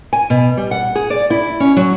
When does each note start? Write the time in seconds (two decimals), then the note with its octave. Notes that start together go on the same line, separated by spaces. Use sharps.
0.13 G#5
0.30 B2
0.57 G3
0.71 F#5
0.95 G#4
1.10 D5
1.30 E4
1.60 C#4
1.77 F#3